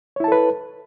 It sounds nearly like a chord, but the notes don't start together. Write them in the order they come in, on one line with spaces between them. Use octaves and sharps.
C#5 E4 A5 A4 B4